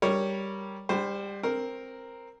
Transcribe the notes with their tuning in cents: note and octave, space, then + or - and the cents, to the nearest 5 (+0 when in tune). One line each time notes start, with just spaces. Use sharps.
G3 +0 A#4 +0 C#5 +0
G3 +25 C5 +0 G5 -40
C4 +10 A#4 +0